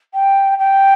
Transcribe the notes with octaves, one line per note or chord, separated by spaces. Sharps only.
G5
G5